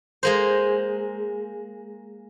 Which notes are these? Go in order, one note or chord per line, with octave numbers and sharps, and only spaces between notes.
G#3 A#3 C5